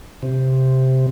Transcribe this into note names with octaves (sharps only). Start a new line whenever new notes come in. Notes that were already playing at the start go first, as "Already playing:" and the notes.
C3